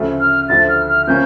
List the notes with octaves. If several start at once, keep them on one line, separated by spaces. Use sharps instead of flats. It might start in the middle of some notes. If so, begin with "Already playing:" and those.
Already playing: D2 C#3 F3 A3
F6
D2 D3 F3 A3 A6
F6
F6
C#3 F3 A#3 C#4 G6